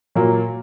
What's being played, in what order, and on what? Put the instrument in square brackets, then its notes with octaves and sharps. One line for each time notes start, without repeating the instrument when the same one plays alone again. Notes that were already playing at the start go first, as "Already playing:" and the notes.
[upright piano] A#2 F#3 A#3